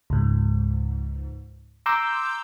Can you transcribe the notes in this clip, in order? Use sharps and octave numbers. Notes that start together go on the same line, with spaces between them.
C#2 G#2
A#5 C6 D6 E6 G6